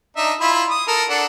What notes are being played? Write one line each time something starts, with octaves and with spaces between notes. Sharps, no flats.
D4 D#4 E5
E4 F4 B5
D#6
A4 A#4
D4 A4 F#5